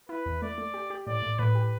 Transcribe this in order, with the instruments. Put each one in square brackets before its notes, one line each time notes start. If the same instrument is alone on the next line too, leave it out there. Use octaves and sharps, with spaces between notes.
[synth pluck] E4 [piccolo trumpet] B4
[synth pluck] E2
[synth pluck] A3 [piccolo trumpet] D5
[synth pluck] A3
G4
G4
[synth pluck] A2 [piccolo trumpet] D5
[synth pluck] A2
[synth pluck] A2 [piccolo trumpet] B4
[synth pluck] G4